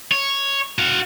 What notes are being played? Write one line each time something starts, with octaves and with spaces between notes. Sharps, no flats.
C#5
F#4 F5